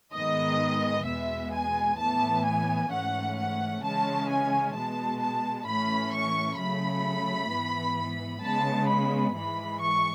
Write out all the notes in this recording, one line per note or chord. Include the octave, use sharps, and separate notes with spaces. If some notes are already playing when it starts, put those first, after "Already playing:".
G#2 D#3 G#3 B3 D#5
E2 B2 G#3 B3 E5
G#5
A2 E3 B3 A5
G#5
G#2 E3 A3 C#4 F#5
F#5
C#3 E3 G#3 C#4 A5
G#5
B2 G#3 B3 A5
A5
A2 E3 A3 C#4 B5
C#6
C#3 F#3 A3 B5
G#2 E3 B3
C#3 G#3 B3 A5
B5
G#2 E3 G#3 B5
C#6